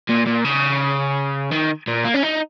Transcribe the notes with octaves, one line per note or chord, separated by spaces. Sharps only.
A#2
A#2
C#3
D#3
A#2
A#3
C#4
D#4